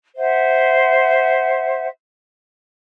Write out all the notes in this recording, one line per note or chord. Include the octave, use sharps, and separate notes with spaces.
C5 E5 F#5